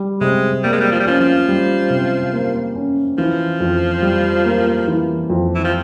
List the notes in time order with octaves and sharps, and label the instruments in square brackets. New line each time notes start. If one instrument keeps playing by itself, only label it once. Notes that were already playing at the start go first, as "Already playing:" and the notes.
Already playing: [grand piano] G3
[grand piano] C3 [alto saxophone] G#3
[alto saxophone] G3 [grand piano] A#3
[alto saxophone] G#3
G3
F3
G3
[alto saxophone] F3 [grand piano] C#4
[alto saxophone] F3
[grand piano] G3
C3
A#3
C#4
[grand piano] E3 [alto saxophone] F3
[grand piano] F2
G3
A#3
E3
F2
[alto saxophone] E3
F3